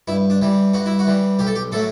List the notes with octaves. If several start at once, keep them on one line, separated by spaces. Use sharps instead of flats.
G2 E4
D4
E3 G3
G2 F#4
E4
F#4
E3 G3
B1 G4
A4
G4
A2 F#3 A3 A4